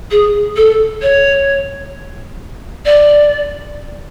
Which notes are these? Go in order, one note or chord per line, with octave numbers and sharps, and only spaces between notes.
G#4
A4
C#5
D5